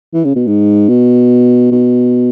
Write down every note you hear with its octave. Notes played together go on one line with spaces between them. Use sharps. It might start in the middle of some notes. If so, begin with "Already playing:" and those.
E3
C#3
B2
G#2
B2
B2